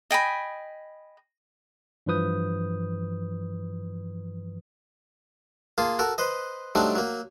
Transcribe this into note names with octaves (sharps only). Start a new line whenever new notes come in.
D#5 G5 G#5 B5
G2 E3 F3 B4 D#6 G6
A#3 F4 G#4 A5
F#4 A4 A#4
B4 C5 D#5
F#3 G3 A3 C4 D4 D#4
F#3 A#3